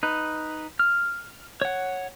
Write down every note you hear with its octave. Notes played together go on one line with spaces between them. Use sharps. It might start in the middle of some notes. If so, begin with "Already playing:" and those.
D#4 B4
F6
C#5 F#5